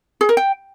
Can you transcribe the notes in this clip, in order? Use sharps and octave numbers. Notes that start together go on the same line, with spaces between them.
G#4
A#4
G5